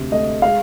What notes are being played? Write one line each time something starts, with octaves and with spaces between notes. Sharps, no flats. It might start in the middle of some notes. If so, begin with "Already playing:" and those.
Already playing: D2 C3
A3 D#5
G#3 F5